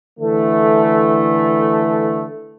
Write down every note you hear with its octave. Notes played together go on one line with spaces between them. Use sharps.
D3 E3 A3